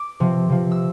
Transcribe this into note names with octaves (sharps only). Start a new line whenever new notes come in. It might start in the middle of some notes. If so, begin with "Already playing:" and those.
Already playing: D6
C3 F3
C3 F3
E6